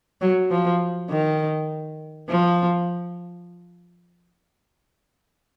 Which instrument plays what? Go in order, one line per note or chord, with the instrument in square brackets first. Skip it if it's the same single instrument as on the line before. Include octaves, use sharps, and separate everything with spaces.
[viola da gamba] F#3
F3
D#3
F3